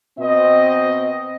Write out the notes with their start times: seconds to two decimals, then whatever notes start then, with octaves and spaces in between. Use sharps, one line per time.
0.18 B2 C4 D#5